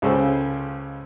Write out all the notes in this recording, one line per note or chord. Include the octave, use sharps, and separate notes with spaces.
C#2 C#3 G#3 C#4 A4 C5